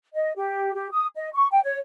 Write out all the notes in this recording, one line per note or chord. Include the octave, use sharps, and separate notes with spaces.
D#5
G4
G4
D#6
D#5
C#6
G5
C#5